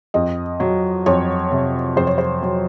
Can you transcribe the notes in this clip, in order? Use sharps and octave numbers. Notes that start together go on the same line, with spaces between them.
F2 D#5
F#3
F2 C#5
C3
F2 C5
C#5
C5
F#3